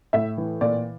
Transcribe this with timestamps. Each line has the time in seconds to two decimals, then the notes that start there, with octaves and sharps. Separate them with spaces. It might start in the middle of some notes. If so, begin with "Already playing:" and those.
0.13 A2 E5
0.38 E3
0.61 A#2 D5